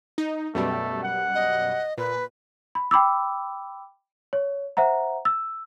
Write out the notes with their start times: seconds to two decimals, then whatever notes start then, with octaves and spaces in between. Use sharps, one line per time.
0.18 D#4
0.55 F#2 B2 G3 A3
1.03 F#5
1.34 D#5
1.98 A#2 B4
2.75 B5
2.91 G5 B5 D6 E6
4.33 C#5
4.77 C5 E5 F#5 A#5
5.25 E6